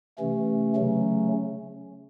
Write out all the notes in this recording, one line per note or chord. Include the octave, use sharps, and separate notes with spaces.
C3 E3 A3 C#4
C#3 F#3 A3 C#4